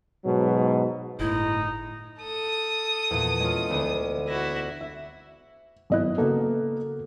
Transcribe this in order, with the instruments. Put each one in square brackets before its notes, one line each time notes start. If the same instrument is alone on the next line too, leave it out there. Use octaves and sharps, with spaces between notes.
[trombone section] G#2 B2 F#3
[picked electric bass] G1 A2 [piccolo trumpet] D#4 [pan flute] E4
[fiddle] A4 D#6
[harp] E2 A#2
G#3 C#4 F4
D2 B3
[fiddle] E4 F#4 [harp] A#6
[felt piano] E5
[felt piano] G#1 D#5 F#6 [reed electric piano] F#3 B3 E4
[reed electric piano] C#3 A4 [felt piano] A#3 B3 F#4